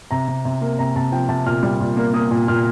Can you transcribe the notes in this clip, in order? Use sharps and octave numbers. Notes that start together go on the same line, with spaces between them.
C3 A#5
C3
C3
A#3
C3 A#5
C3 A5
F3 G5
C3 A5
A#2 F6
G3
A#2
A#3
A#3 D#6
A#2
A#2 F6